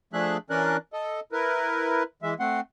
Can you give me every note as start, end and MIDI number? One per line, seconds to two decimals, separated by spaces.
0.13 0.37 53
0.13 0.37 57
0.13 0.37 62
0.13 0.37 68
0.13 0.37 76
0.13 0.37 90
0.50 0.77 52
0.50 0.77 61
0.50 0.77 62
0.50 0.77 70
0.50 0.77 74
0.50 0.77 90
0.93 1.20 69
0.93 1.20 75
1.32 2.03 64
1.32 2.03 70
1.32 2.03 71
2.23 2.34 52
2.23 2.34 56
2.23 2.34 76
2.40 2.60 57
2.40 2.60 60
2.40 2.60 78
2.40 2.60 84